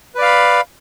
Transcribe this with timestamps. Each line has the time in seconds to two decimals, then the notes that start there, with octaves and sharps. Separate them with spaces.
0.15 B4
0.18 D5
0.22 F5
0.25 B5